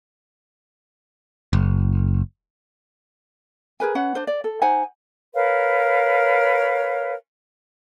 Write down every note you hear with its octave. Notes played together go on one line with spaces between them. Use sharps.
F#1
G#4 A#4 B4 G#5
C#4 B4 F#5
D4 C5
D5
A4
D#4 C5 F#5 G#5
A#4 B4 C#5 F5